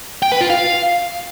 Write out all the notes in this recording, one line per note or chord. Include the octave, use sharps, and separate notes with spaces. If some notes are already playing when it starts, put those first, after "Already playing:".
G5
B4
F4
F5